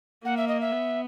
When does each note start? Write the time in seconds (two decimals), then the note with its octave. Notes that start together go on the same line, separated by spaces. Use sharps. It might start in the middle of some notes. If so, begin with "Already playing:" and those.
0.24 A#3 F#5
0.37 E5
0.48 D#5
0.61 E5
0.72 B3